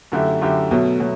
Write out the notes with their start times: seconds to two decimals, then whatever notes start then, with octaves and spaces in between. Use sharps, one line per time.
0.12 F#2 D3 A3 E4 G4
0.42 F#2 D3 A3 E4 G4
0.71 B2 F#3 A3
1.00 B2 F#3